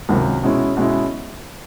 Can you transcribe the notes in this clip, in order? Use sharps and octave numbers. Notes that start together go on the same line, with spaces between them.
C#2 C3 D#3 F#3
B2 G#3 C#4 E4
B2 G#3 C#4 E4